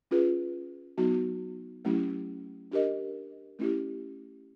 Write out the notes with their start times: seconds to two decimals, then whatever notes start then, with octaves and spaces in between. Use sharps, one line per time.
0.11 C#4 F4 G#4 B4
0.98 F#3 B3 D#4 F#4
1.85 F#3 A3 C#4 E4 G4
2.72 D4 G4 A#4 D#5
3.59 A3 C#4 E4 G4